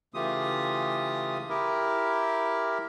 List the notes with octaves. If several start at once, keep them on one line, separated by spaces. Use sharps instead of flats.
C#3 E3 A3 F4 G4 D#6
E4 G4 A#4